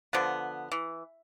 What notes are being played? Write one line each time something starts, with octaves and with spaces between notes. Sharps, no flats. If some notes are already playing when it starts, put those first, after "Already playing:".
D3 F3 B3
E3